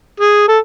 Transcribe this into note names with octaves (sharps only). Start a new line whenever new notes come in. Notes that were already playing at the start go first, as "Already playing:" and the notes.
G#4
A4